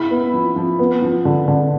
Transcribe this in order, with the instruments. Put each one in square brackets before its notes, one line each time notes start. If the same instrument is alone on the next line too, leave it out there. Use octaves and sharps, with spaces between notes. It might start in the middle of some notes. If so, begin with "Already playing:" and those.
Already playing: [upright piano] E4 B5
B3
F3
F3
B3
F3
D3
D3